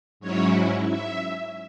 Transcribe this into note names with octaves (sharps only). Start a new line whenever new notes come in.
G#2 F#3 C#4 E4 C#5
E5